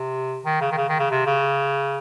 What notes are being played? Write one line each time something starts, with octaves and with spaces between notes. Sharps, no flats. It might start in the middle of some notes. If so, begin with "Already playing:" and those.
Already playing: C3
D#3
C#3
D#3
C#3
D#3
C#3
C3
C#3